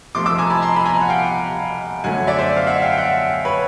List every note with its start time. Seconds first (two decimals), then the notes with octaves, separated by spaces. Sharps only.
0.15 C2 C3 F3 A3 C6 D6
0.26 D6 E6
0.38 G#5 A#5
0.50 A5 B5
0.62 A#5 C6
0.76 B5
0.86 G#5 A#5
1.01 F#5
1.09 F5 G5
2.04 F#2 D3 F#3 A3 F#5 G#5
2.27 D5 E5
2.39 C5 D5
2.57 F5
2.67 E5 F#5
2.82 F5 G5
2.92 G5
2.98 E5 F#5
3.45 B4 C#5